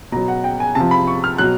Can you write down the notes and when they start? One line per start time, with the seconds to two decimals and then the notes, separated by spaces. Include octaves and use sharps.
0.12 B2 F#3 A#5
0.28 F#5
0.44 G5
0.60 G#5
0.75 C3 F3 A5
0.91 B5
1.07 C#6
1.24 F6
1.38 B2 F#3 F#6